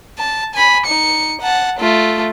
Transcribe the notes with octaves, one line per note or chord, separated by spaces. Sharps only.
A5
G#5 B5
D#4 C#7
F#5 A5
A3 F4